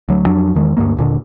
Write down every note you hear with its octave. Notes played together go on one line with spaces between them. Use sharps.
D2 F#3
F2 F#3 D4
E2 D#3 G#3
D2 G2 A3 A#3
D#1 A#2 D3